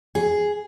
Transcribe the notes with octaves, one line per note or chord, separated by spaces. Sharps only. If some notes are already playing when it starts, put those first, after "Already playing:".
G#4